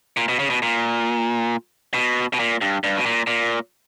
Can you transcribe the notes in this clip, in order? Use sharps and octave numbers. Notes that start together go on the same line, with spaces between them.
A#2
B2
C#3
B2
A#2
B2
B2
A#2
G2
G2
B2
A#2
A#2